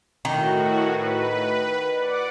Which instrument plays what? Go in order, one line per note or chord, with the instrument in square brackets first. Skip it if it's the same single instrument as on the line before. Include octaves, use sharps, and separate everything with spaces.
[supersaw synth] A2 F#4 [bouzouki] D#3
[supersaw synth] B4
D5 F#5 D6